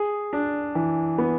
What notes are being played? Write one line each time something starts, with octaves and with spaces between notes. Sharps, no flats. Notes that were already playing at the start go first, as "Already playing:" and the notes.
Already playing: G#4
D4
E3
B3